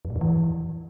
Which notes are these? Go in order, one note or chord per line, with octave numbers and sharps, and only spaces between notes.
F2
A2
F2
E3